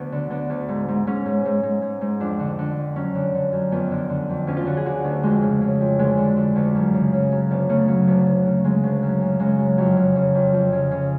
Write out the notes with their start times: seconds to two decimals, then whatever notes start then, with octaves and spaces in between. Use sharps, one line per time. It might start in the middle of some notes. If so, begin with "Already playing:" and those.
Already playing: D2 B3
0.12 D3
0.30 D3 B3
0.50 D2
0.69 G#2
0.88 G#2
1.07 G#2 C#4
1.26 G#2
1.45 G#2
1.63 G#2
1.82 G#2
2.01 G#2
2.20 F2 D4
2.39 D3
2.59 D3
2.77 F2
2.96 F#2 C#4
3.15 D3
3.35 D3
3.53 F#2
3.72 F2 B3
3.91 D3
4.10 D3
4.29 F2
4.47 D2 C#4
4.57 F4
4.66 D3 F#4
4.77 G#4
4.85 D3 F#4
5.04 D2
5.23 F2 G#3
5.42 C#3
5.61 C#3
5.81 F2
5.99 D2 G#3
6.18 D3
6.36 D3
6.56 D2
6.75 F#2
6.94 C#3
7.13 C#3
7.32 F#2
7.51 D2 B3
7.69 C#3 A3
7.88 C#3 F#3
8.07 D2
8.26 D2
8.46 C#3
8.64 C#3 G#3
8.84 D2
9.03 F#2
9.21 C#3
9.39 C#3 G#3
9.59 F#2
9.78 F2 F#3
9.97 C#3
10.16 C#3
10.35 F2
10.54 F2
10.73 C#3
10.91 C#3